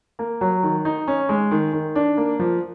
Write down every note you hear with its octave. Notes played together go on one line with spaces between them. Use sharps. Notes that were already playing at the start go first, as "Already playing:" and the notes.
A#3
F#3
D#3
D#4
C#4
G#3
D#3
D#3
D4
A#3
F3